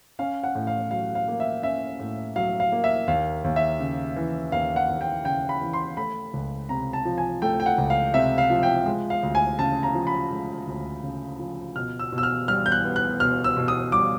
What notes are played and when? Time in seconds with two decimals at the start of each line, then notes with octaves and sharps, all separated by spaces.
0.19 C#4 F5
0.44 F#5
0.55 A2
0.67 F5
0.91 F#3 F5
1.15 F5
1.28 A#3
1.40 E5
1.63 C#4 E5
1.99 A2
2.36 F#3 F5
2.60 F5
2.72 A#3
2.84 E5
3.08 D#2 F5
3.44 D#2
3.56 E5
3.80 C#3
4.16 E3
4.52 D#2 F5
4.76 F#5
4.89 D#2
5.01 G5
5.25 C#3 G5
5.49 B5
5.62 E3
5.73 C6
5.97 A3 B5
6.34 C#2
6.69 C3 A#5
6.93 A5
7.05 F3
7.18 G#5
7.42 A3 G5
7.60 G5
7.66 F#5
7.78 C#2
7.90 F5
8.14 C3 E5
8.38 F5
8.50 F3
8.63 G5
8.86 G#3
9.10 F5
9.23 D2
9.35 G#5
9.59 C#3 A5
9.83 A#5
9.95 F3
10.07 B5
10.31 G#3
10.67 D2
11.03 C#3
11.39 F3
11.76 B2 F6
11.99 E6
12.12 B2
12.18 E6
12.23 F6
12.48 G3 F6
12.66 G6
12.72 F#6
12.85 B3
12.96 F#6
13.20 B2 F6
13.44 E6
13.57 B2
13.68 D#6
13.92 G3 D6